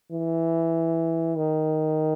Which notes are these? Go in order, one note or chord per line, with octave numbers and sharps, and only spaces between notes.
E3
D#3